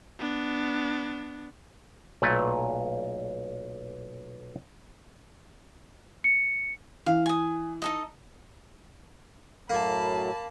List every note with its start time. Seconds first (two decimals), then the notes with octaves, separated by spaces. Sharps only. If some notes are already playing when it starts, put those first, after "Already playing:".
0.19 B3 D4
2.22 B1 A#2 A3 B4 C#5 D5
6.24 C#7
7.06 E3 F5
7.26 G#5 D#6
7.82 D#4 A4 D#5
9.70 F#2 A2 F#3 A#3 A5 B5